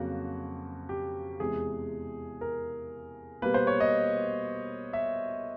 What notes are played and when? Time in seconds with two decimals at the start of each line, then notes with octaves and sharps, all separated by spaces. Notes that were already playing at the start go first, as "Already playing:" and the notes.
Already playing: F2 C#3 F#3 A#3 F#4
0.89 G4
1.40 E2 C3 E3 G#3 G#4
2.41 A#4
3.42 B2 G3 A#3 B4
3.54 C5
3.67 C#5
3.80 D#5
4.93 E5